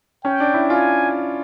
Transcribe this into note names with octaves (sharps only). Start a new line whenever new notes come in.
C#4 G5
D4
E4
F4 G#5